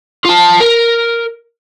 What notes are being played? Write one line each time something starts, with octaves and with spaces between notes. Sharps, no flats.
F4 A5
A#4